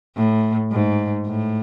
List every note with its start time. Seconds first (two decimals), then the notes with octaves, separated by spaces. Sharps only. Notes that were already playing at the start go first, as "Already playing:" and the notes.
0.16 A2
0.71 G#2
1.26 A2